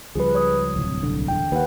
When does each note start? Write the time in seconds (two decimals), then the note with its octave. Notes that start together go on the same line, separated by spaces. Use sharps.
0.15 C#2 F3 G3 G#4 B4
0.35 C#5 D#6
0.76 D1 C2
1.03 B1 D3
1.28 E2 D3 G5
1.52 D#2 B4 F#5